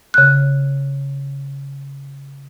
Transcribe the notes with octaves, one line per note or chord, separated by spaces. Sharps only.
C#3 F#6